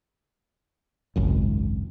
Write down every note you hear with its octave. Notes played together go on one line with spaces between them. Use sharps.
G#1 C#2 F#2